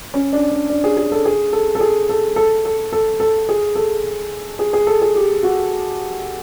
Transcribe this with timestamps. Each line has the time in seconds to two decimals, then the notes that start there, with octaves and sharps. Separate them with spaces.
0.14 C#4
0.33 D4
0.51 D4
0.70 D4
0.84 G#4
0.97 G#4
1.12 A4
1.25 G#4
1.53 A4
1.75 A4
1.80 G#4
2.09 A4
2.36 A4
2.65 A4
2.93 A4
3.20 A4
3.49 G#4
3.75 A4
4.59 G#4
4.73 G#4
4.87 A4
5.02 G#4
5.15 G4
5.43 F#4